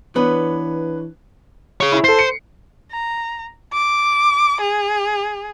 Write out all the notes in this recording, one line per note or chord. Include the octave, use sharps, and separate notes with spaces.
E3 B3 D4 B4 C#5
G#4 C#5
E4
A4 C5 C7
C#7
A#5
D6
G#4